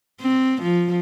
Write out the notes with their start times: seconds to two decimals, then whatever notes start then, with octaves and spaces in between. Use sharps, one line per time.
0.21 C4
0.62 F3